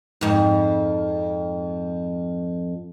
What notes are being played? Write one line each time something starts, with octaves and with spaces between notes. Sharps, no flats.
F2 G#2